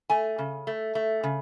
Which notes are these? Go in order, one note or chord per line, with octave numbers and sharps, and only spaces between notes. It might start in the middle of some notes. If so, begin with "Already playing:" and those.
A3 G#5
C#3
A3
A3
C#3